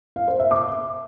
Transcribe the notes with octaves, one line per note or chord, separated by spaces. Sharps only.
F5
C5
E5
D6